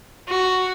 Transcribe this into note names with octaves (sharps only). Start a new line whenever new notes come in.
F#4